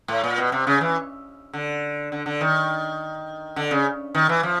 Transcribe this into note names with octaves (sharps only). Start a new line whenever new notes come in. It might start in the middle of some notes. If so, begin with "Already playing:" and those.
A2
A#2
B2
C3
C#3
E3
D3
D3
D3
D#3
D3
C#3
D#3
E3
F3